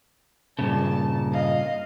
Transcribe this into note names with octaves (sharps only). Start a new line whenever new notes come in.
G2 A#2 C#3 A5
D#5 F5